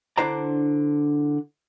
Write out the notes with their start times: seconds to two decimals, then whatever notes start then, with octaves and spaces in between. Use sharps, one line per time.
0.18 D3 D4 E4 C5 D5 A#5